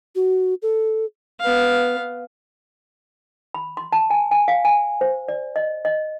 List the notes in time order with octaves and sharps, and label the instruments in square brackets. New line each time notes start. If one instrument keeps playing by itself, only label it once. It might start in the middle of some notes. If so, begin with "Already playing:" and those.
[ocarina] F#4
A4
[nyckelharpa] B3 F5
[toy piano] B5
C6
A5
G#5
G#5
F5
G#5
C5
D5
D#5
D#5